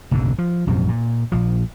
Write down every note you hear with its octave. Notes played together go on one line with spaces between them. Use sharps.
F#1 B1 G#2 D3
F3
A#1 F#2 C3 F3
A#2
A#1 F3